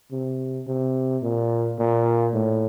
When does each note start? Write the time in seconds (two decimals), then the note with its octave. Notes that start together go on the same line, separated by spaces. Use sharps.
0.11 C3
0.67 C3
1.23 A#2
1.79 A#2
2.34 A2